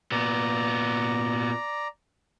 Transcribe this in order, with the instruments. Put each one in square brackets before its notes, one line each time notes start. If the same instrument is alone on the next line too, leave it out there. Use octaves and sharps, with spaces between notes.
[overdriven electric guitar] A#2 B3 [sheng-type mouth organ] D5 A#5